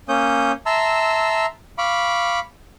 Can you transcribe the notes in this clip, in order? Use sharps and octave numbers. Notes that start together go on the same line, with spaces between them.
A#3 C#4 C#5 D#6 G6
E5 A5 A#5 C6 E6
F5 B5 C#6 D6